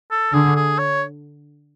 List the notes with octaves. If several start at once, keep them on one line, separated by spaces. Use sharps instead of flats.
A4
D3 G#4
G#4
C#5